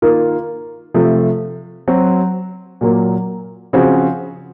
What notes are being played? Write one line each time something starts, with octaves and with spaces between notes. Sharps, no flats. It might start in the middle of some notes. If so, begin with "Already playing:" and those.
D#3 A#3 F4
C3 F3 A3
F#3 C4 F#4
A#2 F#3 A#3
C#3 F3 C4 F#4